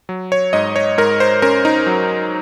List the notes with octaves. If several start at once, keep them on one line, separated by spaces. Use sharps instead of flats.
F#3
C#5
G#2 D#5
C#5
G#2 A#4
C5
C#4 A#4
D#4
F#3